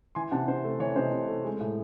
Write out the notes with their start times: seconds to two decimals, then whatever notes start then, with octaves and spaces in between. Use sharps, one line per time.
0.15 E3 G#5 C6
0.31 C3 F#5 A5
0.48 C3 C5
0.64 A3
0.79 E3 C#5
0.96 C3 C5 D#5
1.12 C3
1.29 A3
1.45 G#3
1.60 A2